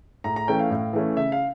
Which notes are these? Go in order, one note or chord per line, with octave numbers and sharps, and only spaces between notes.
A2 A#5
A#5
E3 A3 C#4 G5
F5
A2
E3 A3 C#4
C#3 E5
F5